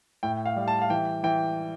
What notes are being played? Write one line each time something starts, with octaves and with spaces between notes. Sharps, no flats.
A2 G5
F5
G3
A5
F5
E3 G5
E3 G5